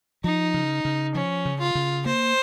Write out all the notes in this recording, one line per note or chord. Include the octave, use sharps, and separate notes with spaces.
F3 D#4
C#3
C#3
F3 C#4
C#3
F4
C#3
A#3 C5